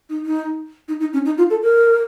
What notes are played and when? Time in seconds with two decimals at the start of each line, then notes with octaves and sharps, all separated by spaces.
0.10 D#4
0.26 D#4
0.88 D#4
1.00 D#4
1.13 C#4
1.25 D#4
1.38 F4
1.50 A4
1.62 A#4